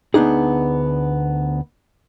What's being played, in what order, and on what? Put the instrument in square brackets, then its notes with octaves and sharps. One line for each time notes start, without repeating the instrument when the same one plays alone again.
[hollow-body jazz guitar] D2 B3 D4 D#4 G#4